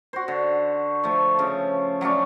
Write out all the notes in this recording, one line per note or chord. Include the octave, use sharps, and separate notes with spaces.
F#4 C5
D3
F3 A3
C#3 F3
F#3 A3 C#4 D4